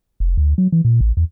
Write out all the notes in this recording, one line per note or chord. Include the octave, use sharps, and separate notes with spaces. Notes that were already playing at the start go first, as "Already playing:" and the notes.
F1
D2
F#3
E3
A#2
A1
E2